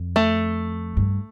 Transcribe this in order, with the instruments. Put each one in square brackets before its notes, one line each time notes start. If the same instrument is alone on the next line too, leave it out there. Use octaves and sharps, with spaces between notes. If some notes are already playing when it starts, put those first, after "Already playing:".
Already playing: [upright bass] F2
[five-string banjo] A3
[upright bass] G2